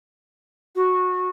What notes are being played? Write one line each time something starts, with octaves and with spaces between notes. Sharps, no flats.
F#4